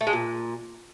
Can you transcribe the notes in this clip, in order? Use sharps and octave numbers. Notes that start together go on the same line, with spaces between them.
A3
G#3
A#2